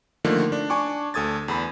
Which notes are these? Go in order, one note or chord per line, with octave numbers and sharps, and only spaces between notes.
D3 D#3 F3 A3 A#3
D4
D4 G#5 C#6 D6
D2 A4 D#6 G#6 A6
E2 B5